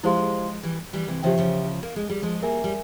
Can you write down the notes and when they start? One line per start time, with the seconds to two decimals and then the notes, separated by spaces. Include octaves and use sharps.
0.04 F3 G#3 E4 G4 C5 F5 C6
0.64 E3 G3
0.93 E3 G3
1.08 C3 E3
1.23 C#3 F3 G4 C5 E5 G5
1.38 C#3 F3
1.83 A#3
1.96 G#3
2.10 G3
2.22 F3 G#3
2.42 G3 A#3 A#4 E5 G#5
2.64 G3